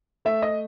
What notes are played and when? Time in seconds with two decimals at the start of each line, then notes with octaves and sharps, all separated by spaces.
0.25 A3 E5
0.42 D#5